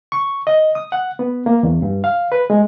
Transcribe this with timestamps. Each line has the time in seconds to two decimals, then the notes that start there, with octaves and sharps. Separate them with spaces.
0.12 C#6
0.47 D#5
0.75 D#6
0.92 F#5
1.19 B3
1.46 A#3
1.63 E2
1.82 G2
2.04 F5
2.32 B4
2.50 G#3